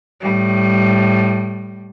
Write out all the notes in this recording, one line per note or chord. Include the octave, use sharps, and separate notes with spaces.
A2 G3